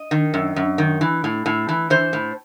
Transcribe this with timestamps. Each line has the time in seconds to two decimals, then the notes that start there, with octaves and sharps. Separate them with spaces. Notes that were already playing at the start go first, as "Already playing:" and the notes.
Already playing: D#5
0.11 D#3
0.34 F#2
0.56 F#2
0.78 D#3
1.01 E3
1.24 A2
1.46 A2
1.69 E3
1.90 E3 C5
2.13 A2